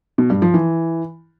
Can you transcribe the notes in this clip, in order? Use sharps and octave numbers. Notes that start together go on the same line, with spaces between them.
B2
G2
F3
E3